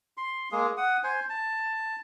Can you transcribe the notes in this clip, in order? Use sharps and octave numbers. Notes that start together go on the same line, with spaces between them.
C6
G#3 A#3 G#4
F#5 D#6
C5 G#5
A5